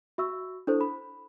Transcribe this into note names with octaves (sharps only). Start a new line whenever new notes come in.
F#4 E5 C#6 E6
D4 E4 A4 C5
B5